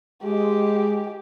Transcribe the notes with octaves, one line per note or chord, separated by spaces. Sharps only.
G#3 G4